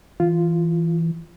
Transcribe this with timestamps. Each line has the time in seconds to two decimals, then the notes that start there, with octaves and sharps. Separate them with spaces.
0.20 E3 F4